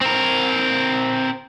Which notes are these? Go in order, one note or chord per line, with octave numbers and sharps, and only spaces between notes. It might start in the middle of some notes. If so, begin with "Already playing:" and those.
C4 A#4